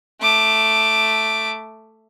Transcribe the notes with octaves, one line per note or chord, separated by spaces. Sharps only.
A3 D6